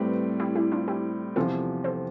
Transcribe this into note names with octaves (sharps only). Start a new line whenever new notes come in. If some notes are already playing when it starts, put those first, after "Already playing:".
Already playing: A2 G3 C4 G4 B4
E4 G4
E4 G4
D4 F4
E4 G4
E2 C3 F3 F4 A4
A4 C5